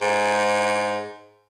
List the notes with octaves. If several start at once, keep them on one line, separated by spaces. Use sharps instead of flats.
G#2